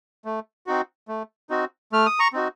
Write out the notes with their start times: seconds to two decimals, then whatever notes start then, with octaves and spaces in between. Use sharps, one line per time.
0.25 A3
0.67 C4 D#4 F#4
1.08 A3
1.50 C4 D#4 F#4
1.92 A3 F6
2.06 D#6
2.19 A#5 C#6
2.33 C4 D#4 F#4